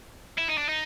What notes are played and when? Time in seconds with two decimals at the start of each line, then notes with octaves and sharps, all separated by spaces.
0.38 E4
0.48 D#4
0.58 D4
0.69 D#4